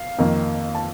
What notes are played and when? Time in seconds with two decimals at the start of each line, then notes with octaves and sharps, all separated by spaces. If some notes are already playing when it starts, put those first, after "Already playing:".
Already playing: F5
0.18 F2 D#3 A#3
0.75 A5